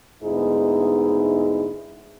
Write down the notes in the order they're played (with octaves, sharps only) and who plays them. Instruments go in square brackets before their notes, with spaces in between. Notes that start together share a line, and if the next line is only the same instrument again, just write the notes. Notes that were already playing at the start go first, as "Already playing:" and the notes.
[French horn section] D2 G#2 B3 D#4 E4 G#4